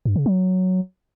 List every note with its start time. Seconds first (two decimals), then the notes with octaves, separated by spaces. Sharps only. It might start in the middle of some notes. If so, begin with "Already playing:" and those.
0.05 G2
0.16 C#3
0.26 F#3